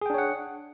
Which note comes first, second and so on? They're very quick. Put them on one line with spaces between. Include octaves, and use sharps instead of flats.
G#4 G5 D4 C#5 F#5